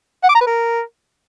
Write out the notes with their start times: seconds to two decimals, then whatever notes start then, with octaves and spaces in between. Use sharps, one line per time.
0.23 F#5
0.29 D6
0.35 A#5
0.41 B4
0.47 A#4